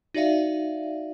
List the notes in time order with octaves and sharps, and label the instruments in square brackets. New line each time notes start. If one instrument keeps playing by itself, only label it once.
[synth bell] D#4 F#4 D5 E5 F5